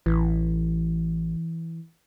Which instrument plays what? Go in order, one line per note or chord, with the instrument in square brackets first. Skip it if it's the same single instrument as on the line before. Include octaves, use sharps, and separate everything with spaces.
[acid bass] A1 [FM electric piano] E3